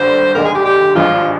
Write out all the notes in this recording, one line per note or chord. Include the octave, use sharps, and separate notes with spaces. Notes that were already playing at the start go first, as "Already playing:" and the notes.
Already playing: G#1 G2 D3 C5
F1 D#2 D3 G#3 A#4
G#4
G4
G4
G#1 G2 F3 G#3 F4